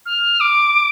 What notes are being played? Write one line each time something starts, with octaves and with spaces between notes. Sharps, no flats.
F6
D6